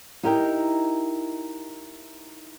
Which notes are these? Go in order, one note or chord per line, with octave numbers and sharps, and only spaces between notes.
D#4 E4 G4 A#4 D#5 G5